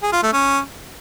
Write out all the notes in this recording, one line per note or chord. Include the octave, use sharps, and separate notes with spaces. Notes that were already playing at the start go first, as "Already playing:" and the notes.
G#4
F4
A3
C#4